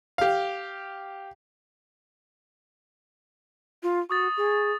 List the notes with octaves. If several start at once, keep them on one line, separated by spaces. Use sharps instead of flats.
G4 F5
F4
F#4 C#6 D#6 A6
G#4